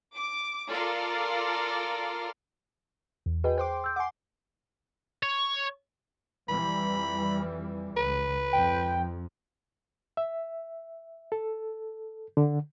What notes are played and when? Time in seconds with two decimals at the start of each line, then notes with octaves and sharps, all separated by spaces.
0.15 D6
0.71 F4 A4 A#4 D5 F5
3.26 E2
3.44 F#4 G#4 B4 D#5 G5
3.58 C5 G5 C6 D6
3.84 E6 G6
3.96 F#5 G#5 C6 D6
5.23 C#5
6.49 F2 E3 G3 B5
7.97 C#2 B4
8.53 F2 G5
10.17 E5
11.32 A4
12.37 D3